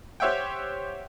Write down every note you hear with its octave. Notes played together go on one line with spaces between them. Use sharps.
G4 C5 C#5 E5 F#5 G5